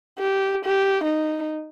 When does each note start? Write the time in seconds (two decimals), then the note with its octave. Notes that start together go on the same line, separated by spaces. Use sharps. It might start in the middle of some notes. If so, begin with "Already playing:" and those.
0.20 G4
0.65 G4
1.04 D#4